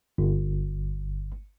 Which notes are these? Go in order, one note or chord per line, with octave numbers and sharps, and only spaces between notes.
G1